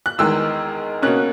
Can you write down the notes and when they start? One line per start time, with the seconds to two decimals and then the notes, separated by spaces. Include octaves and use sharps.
0.06 F#6
0.18 E2 D#3 G#3 E6
1.02 B2 A#3 C#4 F#6